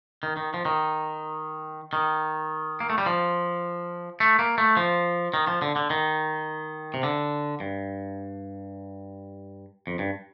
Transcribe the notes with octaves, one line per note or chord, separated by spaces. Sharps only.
D#3
D#3
F3
D#3
D#3
A#3
A3
G3
F3
A3
A#3
A3
F3
D#3
F3
D3
D3
D#3
C3
D3
G2
F2
G2